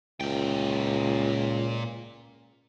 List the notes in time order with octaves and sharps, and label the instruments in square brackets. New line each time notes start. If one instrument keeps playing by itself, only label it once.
[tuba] C#2 [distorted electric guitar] A#2 G5